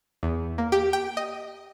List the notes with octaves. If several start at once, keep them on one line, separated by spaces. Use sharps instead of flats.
E2
A#3
G4
G5
D#5